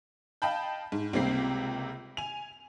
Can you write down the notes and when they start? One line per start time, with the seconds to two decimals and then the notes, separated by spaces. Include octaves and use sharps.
0.42 D#5 F5 G5 A5 B5 G6
0.92 G#2
1.13 C#2 C3 G3 A#3 C4 C7
2.17 G#5 F7